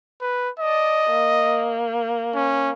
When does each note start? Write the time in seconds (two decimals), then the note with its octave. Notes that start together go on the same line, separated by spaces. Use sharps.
0.21 B4
0.59 D5 D#5 A5
1.10 A#3
2.34 C#4